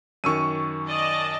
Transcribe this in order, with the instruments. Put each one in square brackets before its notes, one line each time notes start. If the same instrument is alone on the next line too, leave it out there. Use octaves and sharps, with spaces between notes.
[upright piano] F#2 D#3 [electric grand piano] C#6 E6 D#7
[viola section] D5 D#5 A5